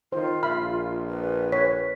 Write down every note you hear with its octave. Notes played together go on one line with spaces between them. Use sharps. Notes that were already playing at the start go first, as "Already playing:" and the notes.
D#3 F4 C5
A#1 E5 B5 F6
B4
C#5 B6